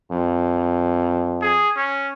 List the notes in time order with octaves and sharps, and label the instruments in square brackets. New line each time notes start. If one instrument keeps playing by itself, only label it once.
[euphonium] F2
[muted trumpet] G#4
C#4